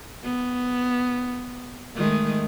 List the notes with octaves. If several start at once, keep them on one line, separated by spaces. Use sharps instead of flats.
B3
D#3 G#3 A3